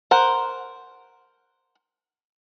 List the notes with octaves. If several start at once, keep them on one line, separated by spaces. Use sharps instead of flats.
A#4 C5 F#5